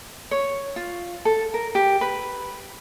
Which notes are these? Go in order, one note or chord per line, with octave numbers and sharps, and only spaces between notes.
C#5
F4
A4
A#4
G4
B4